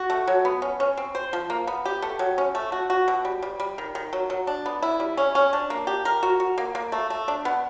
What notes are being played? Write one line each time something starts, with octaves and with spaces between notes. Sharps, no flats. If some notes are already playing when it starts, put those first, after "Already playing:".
Already playing: F#4
A3
F#3
B3
C#4
C#4
C4
C5
F3
A#3
B3
G4
A3
F#3
C#4
A3
F#4
F#4
B2
G3
G3
G3
D#3
D#3
F#3
F#3
D4
B3
E4
G3
C#4
C#4
D4
A#3
G4
A#4
F#4
F#4
A#3
A#3
A3
A3
D4
B3